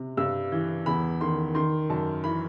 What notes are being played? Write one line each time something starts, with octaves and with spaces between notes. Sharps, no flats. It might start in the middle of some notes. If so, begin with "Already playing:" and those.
Already playing: C3
G2 E6
E3
E2 B5
D#3 C6
D#3 C6
F#2 A5
E3 B5